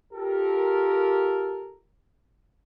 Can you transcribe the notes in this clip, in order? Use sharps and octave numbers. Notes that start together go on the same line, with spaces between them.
F4 G4 A4 A#4